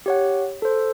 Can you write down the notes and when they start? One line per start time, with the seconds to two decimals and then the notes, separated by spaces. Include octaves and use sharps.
0.06 G4 C#5 F#5
0.62 A4 C5